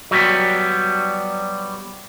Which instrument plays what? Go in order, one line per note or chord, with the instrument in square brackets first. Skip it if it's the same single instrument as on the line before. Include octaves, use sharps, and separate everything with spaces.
[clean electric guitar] F#3 G3 B3